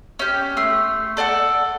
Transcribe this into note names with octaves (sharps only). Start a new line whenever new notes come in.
C#4 G4
A3 C6
A4 D5 D#5 F#5